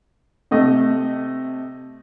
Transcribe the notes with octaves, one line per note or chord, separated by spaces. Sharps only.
C3 A3 D#5